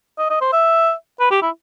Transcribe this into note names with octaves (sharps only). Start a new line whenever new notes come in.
D#5
D#5
C5
E5
B4
G4
E4